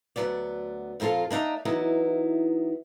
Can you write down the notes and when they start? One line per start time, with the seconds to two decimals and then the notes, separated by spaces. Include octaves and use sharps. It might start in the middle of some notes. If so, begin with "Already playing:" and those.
0.16 D2 A2 F#3 B3 D5
1.00 F2 A#2 A#3 F4 A4
1.31 A#3 D4 D#4 E5 A#5
1.65 E3 F#3 B3 D#4 E4